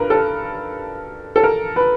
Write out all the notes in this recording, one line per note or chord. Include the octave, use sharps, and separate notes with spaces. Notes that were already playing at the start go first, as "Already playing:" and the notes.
Already playing: G2 A#4 B4
A4
A4
A#4
B4